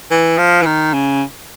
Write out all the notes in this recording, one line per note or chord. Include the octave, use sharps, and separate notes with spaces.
E3
F3
E3
D#3
C#3